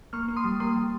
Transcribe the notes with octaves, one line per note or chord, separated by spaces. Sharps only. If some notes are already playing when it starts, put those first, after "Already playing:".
A#3 C#6 F6
A#3
C6 D#6
G3
A#3 C6 D#6
G3